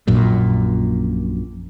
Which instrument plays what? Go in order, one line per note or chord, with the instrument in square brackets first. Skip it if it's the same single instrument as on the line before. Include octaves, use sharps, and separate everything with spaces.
[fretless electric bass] A#1 F#2 A#2